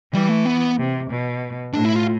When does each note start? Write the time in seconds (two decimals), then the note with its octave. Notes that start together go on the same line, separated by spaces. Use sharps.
0.14 E3 G3
0.29 A3
0.46 B3
0.78 C3
1.10 B2
1.73 A2 D4
1.85 E4
1.96 F4